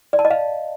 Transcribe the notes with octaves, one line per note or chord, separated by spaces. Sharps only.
D5
A5
D#5
F5